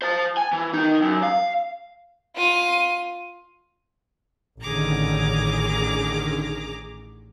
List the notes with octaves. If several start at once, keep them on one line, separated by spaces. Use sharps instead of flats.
C5 A5
G#5
E3
D#3 D#4
F#2
F5
F4 D#7
A1 D3 D#3 C#4 G#4 A#5 D6